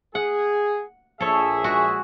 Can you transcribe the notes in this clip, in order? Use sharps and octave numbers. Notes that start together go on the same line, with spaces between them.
G#4 F#5
A#1 G#4 A4 C#5 E5
G#3 F#4